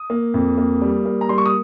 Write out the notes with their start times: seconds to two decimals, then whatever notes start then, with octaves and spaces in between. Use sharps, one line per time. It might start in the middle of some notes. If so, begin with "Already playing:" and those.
Already playing: D#6
0.10 A#3
0.34 F2
0.58 A#3
0.82 G3
1.05 A#3
1.21 A#5
1.29 G3 C6
1.38 C#6
1.46 D#6